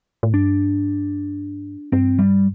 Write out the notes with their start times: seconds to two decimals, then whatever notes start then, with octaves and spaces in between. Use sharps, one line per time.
0.23 A2
0.33 G2 D4
1.92 G2 C4
2.19 G3